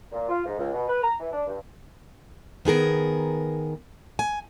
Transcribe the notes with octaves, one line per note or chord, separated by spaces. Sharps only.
A#2
F4
G#2
C#2
B2
B4
A#5
E3
D4
G2
D#3 B3 G#4 A#4
G#5